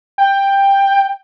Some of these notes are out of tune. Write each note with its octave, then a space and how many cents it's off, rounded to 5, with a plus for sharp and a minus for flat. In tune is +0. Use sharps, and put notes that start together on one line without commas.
G5 +10